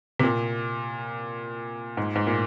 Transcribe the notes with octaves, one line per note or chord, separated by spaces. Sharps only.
C3
A#2
G#2
G#2
A#2